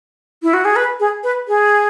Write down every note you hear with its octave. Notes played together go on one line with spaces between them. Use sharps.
E4
F#4
G#4
B4
G#4
B4
G#4